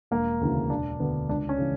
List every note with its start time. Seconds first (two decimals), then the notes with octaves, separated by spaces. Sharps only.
0.11 E1 A#3
0.41 D2 C#3 E3
0.70 E1 D4
1.00 D2 D3 B3
1.29 C#2 D4
1.49 C#4
1.58 C#3 E3